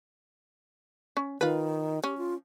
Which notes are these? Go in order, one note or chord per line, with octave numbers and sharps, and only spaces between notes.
C#4
D#3 F4 B4
C#4 G4
F4